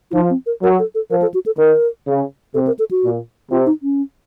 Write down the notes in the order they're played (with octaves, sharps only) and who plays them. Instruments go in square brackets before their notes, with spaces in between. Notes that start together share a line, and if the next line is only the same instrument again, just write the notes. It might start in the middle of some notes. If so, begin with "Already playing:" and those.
[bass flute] F4
[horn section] F3 [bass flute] D#4
[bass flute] C4
A#4
[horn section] F#3 [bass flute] A#4
[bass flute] A4
A4
[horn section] F3 [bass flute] A#4
[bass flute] A4
F#4
A4
[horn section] D#3 [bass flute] A#4
[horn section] C#3
[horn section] C3 [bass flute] A4
[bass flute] A#4
A4
F#4
[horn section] A#2
[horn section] C3 [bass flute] F4
[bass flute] D#4
C#4